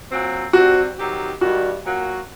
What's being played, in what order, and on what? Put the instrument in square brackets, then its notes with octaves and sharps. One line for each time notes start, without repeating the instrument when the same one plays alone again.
[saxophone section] A#2 F#3 C4
[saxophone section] C3 G3 C4 [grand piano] F#4
[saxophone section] D#3 F#3 C4 G4
[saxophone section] G2 D#3 G3 [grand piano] F#4
[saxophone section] A#2 F#3 A#3 F#4